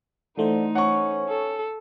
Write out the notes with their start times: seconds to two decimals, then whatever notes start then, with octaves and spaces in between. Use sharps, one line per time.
0.38 D3 E3 A3 D#4 C5
0.75 C#4 F#5 C#6
1.29 A4